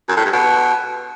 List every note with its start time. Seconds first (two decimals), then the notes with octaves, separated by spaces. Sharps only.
0.09 F#2
0.17 A2
0.25 G2
0.33 B2